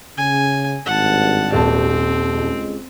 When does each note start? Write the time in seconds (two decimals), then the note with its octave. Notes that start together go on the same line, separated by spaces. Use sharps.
0.17 C#3 G#5
0.86 G#1 G2 F#5 A5
1.53 D#1 C4 A5
2.30 C#2 G#3